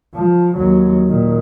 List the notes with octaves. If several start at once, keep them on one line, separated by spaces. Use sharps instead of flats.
F3
D#2 F#3
A#2 D#3